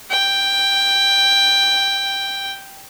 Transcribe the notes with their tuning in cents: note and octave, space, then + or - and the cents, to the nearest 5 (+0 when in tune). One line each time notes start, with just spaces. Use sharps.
G5 +5